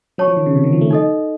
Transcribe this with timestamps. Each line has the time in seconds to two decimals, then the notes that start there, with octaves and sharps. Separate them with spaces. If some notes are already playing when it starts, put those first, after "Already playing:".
0.18 F#3 C#5 A5 C#6
0.27 F3
0.37 D#3
0.46 C#3
0.55 C3
0.64 D#3
0.73 F3
0.81 A3
0.91 D#4 A4 D#5